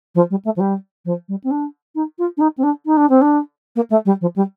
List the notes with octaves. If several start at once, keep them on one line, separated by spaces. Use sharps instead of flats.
F3
G3
A3
F3
G3
F3
G3
C4
D4
D#4
F4
D4
D#4
C4
D4
D#4
D4
C4
D4
A#3
A3
G3
F3
G3